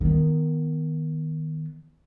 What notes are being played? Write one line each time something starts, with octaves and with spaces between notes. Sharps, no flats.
D#3 B3